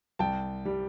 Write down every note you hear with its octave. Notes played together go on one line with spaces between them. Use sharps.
C2 G5 A5
G3